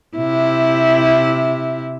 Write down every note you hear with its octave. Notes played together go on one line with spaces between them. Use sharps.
C3 E4